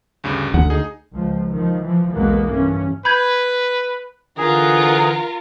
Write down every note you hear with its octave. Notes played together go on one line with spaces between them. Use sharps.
D2 G2 C#3
D2 F#5
D#4 G#4
C#2 F3
D#3 F3
E3 F3
B1 E2 G#3 A#3 B3
G2 E3 C#4
B4 B5 G6 G#6
D3 E3 F4 G#4 A#4 F#5